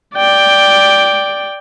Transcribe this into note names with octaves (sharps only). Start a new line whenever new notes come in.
D5 G5